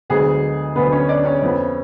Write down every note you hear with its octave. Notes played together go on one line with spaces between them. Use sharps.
D2 D3 F#3 G#3 B3 G#4
D2 D3 F#3 B3 B4
C#4 C#5
D4 D5
C#4 C#5
F2 F3 B3